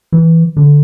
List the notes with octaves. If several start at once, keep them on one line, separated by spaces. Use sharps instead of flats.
E3
D3